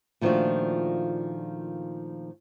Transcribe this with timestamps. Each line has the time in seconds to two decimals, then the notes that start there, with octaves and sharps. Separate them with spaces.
0.21 A#2 D#3 F3 A3 D4 F#4